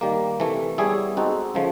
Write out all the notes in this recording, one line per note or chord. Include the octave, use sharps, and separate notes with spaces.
D#3 G3 A#3
C3 E3 A3
G3 B3 E4 G#4 C#5
G#3 C4 D#4 F#4 A4
C#3 F3 A3